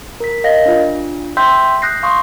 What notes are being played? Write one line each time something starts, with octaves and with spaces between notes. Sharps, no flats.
A#4 B6
A#4 D#5 F5 A#6
D4 F4
E5 G5 C6 E6 G6 B6
D#6 F#6 G6 A#6 C7
F5 C6 C#6 D#6